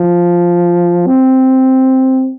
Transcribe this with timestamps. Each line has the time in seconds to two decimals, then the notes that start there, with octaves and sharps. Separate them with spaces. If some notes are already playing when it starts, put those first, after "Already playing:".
Already playing: F3
1.06 C4